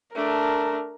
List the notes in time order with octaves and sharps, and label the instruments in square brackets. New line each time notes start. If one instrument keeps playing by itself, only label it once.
[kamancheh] A3 D4 [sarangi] A#4